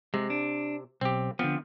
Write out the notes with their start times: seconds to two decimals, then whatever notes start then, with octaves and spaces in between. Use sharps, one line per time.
0.14 C3 G#3
0.30 D4
1.01 B1 C4 G4
1.39 D3 F3 B3 C4